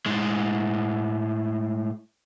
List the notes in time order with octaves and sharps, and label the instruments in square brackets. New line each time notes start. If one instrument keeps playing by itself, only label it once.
[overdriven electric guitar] A2 G#3